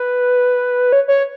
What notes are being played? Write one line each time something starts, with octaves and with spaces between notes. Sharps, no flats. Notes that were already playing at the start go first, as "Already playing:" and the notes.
Already playing: B4
C#5
C#5